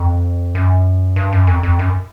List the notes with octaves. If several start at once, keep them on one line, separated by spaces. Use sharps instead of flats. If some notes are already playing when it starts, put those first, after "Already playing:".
Already playing: F2
F#2
G2
F#2
F2
F2
F#2